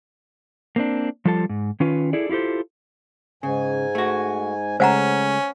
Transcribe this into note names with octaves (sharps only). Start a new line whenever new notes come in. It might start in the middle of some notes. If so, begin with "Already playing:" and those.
A#3 C4 D4
F3 G3 F4 A4 F5 A5
G#2
D#3 C#4 F4 B4
E4 G#4 A4 D5
E4 F4 G4 A4 C5
G#2 C#3 G#5
A3 F#4
C#3 G#3 A3 C#4 C5 F#5 A#5